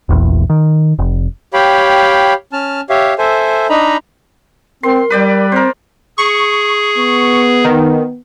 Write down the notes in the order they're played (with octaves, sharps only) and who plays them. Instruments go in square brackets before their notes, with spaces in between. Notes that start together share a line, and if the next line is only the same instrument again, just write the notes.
[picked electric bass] E1 A#1 E2
D#3
F1
[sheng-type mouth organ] G4 C#5 F5 G5 B5
C#4 A5 F6
G4 C#5 E5 F5
A4 C5 E5 G#5
D4 D#4 D#5 A#5 B5
[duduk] C4 [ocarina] A#4 [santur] C6
[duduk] G3 [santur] B4 D5 G5
[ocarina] C4 [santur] A#4 C5
[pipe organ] G#4 [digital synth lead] C#6
[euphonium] B3
[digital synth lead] D#3